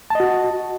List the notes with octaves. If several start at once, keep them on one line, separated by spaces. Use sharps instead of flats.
F#4 D#5 A5